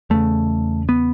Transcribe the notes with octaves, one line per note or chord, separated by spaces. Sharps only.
E2 C#3 A3
B3